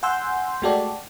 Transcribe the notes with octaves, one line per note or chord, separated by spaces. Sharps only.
F#5 G#5 C6 E6 G6
G#3 A3 F#4 G4 A4 D5